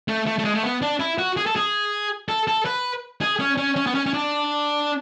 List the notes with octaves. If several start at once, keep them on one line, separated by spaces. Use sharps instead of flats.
A3
A3
A3
G#3
A3
B3
D4
E4
F#4
G#4
A4
G#4
A4
A4
B4
G#4
C#4
C#4
C#4
B3
C#4
C#4
D4